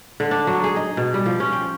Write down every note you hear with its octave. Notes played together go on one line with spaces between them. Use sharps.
D3
D4
F#3
G#4
D#4
B2
G3
F3
C#4
G5